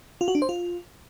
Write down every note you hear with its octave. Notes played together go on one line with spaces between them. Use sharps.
F4
F#4
D4
C5
F4